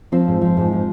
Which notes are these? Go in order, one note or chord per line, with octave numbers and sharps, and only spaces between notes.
F3 C4
G#2
F3
G#2
F3